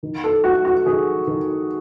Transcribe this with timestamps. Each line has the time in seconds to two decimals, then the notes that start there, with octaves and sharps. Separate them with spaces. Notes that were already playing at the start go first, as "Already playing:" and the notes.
0.03 D#3
0.24 A4
0.44 A3 F#4
0.65 F#4
0.86 D#3 G#4
1.27 D#3